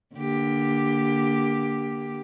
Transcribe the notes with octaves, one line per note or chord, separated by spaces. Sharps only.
D3 A#3 G4